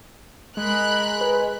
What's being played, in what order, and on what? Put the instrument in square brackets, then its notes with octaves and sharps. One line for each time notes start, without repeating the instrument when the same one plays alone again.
[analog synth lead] G#3 [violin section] A#4 B5 F#6
[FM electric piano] B4